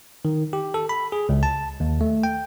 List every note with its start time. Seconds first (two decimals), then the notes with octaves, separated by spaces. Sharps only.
0.25 D#3
0.53 G4
0.74 A4
0.89 B5
1.12 G#4
1.29 C#2
1.43 A5
1.80 D#2
2.01 A3
2.23 G5